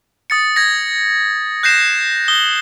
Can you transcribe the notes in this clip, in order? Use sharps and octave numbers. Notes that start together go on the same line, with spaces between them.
D#6 A6 C#7
G#6 A#6
F#6 G6 A#6 C7 E7
D#6 G7